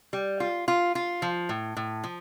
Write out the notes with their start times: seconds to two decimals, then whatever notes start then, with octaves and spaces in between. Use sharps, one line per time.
0.13 G3
0.40 F4
0.68 F4
0.95 F4
1.22 F3
1.49 A2
1.77 A2
2.04 F3